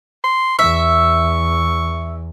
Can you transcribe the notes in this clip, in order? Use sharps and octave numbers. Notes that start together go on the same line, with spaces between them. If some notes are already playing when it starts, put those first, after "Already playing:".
C6
E2 E5 C#6